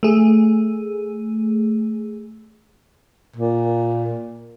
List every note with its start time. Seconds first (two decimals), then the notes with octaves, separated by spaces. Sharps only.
0.03 A3 G#4
3.36 A#2